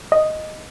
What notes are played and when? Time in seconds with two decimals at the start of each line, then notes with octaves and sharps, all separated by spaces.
0.12 D#5